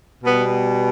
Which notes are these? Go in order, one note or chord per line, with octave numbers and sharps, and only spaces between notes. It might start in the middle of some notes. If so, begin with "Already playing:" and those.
B2 G3 B3